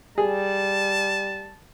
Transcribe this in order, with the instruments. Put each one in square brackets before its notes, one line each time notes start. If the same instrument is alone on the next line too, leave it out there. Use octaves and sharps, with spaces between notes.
[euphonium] G3 [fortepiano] G#4 [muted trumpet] A5